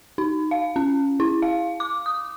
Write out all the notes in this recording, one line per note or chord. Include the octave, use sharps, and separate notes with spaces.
D#4
F5
C#4
E4
F5
D6
D#6